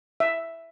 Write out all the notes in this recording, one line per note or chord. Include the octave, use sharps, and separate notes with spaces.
E5